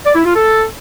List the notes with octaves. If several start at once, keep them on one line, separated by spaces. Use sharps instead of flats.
D5
E4
F4
A4